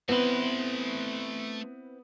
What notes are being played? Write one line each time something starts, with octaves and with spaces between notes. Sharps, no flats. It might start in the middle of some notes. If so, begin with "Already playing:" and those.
A3 B3 C4 E4 B4 C6